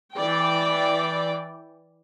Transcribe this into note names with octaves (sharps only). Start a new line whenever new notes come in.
E3 D5 G5